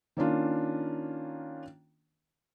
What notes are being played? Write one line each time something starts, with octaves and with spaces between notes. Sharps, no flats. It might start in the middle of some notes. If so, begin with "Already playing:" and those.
D#3 A#3 C#4 D4 F4